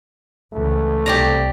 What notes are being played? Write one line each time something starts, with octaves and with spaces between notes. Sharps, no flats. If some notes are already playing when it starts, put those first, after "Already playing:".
C#2 E3 A3
C2 G4 D5 A#5